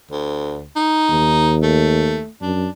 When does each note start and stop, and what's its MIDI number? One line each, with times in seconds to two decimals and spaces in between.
0.11 0.66 38
0.76 1.56 63
1.09 2.22 39
1.63 2.29 57
2.42 2.67 42
2.42 2.70 62